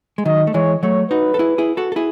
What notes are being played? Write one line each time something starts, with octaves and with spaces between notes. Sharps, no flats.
G#3
D#3 F#3 D#5
A3
E3 G#3 C#5
F#3 A3 C#5
D#4 F#4 B4
A4
E4 G#4
E4 G#4
F#4 A4
A4
E4 G#4